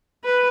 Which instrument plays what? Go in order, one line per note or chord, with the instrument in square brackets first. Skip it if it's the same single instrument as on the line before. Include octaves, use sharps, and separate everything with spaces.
[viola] B4